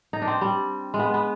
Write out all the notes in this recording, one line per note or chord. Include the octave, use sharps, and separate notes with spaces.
D#4
D4
C4
G3
G#3
B3
B3